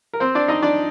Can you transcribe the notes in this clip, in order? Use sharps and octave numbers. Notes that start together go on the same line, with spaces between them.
A#4
C4 C5
D4 D5
D#4 D#5
D4 D5